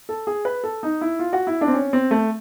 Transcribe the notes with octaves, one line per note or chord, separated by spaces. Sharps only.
A4
G#4
B4
A4
D#4
E4
F4
F#4
E4
D4
C4
C#4
C4
A3